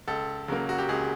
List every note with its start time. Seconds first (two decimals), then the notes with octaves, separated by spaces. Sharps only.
0.08 C#2 A4
0.48 C#3 F#3 A#3
0.69 F#4
0.79 G4
0.89 C#2 G#4